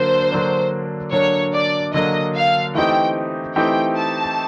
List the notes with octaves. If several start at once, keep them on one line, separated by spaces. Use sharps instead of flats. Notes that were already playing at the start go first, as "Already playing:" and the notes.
Already playing: D3 F#3 A#3 D4 C5
D3 F#3 A#3 D4
D3 F#3 A#3 D4 C#5
D5
D3 F#3 A#3 D4 D#5
F5
E3 A3 C4 D#4 G4 G5
E3 A3 C4 D#4 G4 G5
A5